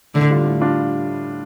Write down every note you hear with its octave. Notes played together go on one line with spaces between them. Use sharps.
A2 D3
G3 D4 F4
A2
G3 D4 F4